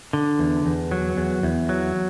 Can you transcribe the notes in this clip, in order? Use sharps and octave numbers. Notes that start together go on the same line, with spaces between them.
D3
E2
E2
F#3
E2
E2
F#3